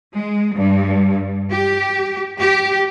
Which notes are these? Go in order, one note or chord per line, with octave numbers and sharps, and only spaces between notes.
G#3
G2
G4
G4